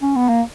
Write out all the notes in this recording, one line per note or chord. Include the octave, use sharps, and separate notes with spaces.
C#4
B3
A#3